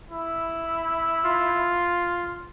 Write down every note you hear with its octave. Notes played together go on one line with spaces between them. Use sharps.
E4
F4